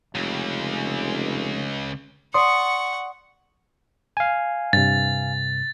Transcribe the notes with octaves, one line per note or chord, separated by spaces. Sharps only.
F1 C#2 C#3
D5 F#5 C6 C#6 D#6
F5 G#5
G2 C3 A6